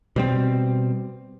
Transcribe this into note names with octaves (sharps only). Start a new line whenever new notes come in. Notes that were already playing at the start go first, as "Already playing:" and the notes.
B2 G3 C4